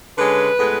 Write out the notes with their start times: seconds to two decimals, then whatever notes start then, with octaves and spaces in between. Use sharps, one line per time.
0.18 D3 G#3 C#4 B4
0.59 A2 G#3 B3